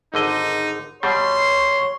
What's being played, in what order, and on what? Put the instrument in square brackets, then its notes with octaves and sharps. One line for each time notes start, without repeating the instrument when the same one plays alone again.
[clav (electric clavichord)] G#1 D3 D#5 [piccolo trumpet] D#4
[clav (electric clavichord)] B2 G3 [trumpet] C#5 [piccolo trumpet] C6